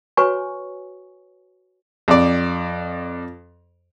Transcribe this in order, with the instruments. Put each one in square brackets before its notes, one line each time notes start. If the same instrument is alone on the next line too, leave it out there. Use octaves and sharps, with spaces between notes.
[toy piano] F#4 B4 C#5 G#5 C#6
[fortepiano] F2 D5